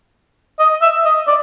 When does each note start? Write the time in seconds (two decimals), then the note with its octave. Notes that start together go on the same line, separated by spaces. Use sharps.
0.59 D#5
0.82 E5
1.05 D#5
1.27 D5